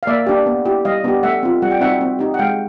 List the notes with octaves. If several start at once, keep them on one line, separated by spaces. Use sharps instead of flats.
F5
A#3 D5 E5
D4 G4
B3
E4 G4
G3 D#5 F5
B3 D4 G4
A3 E5 F#5
C4 F4
G3 F#5
G5
C4 D#4 F#4 E5 F#5
C4
D#4 G4
F#5
G#3 F5 G5